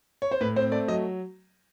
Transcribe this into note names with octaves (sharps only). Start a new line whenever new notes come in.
C#5
C5
A2 B4
C4 C5
A3 D5
F#3 D#5